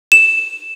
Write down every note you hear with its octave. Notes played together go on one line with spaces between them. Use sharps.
E7